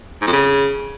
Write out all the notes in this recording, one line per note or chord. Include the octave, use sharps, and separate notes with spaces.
G#2
F2
C#3